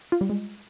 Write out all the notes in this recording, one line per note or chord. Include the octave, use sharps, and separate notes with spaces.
F4
G3
G#3